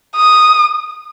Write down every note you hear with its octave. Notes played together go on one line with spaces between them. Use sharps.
D#6